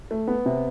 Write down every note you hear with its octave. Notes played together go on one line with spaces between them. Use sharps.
A3
B3
C3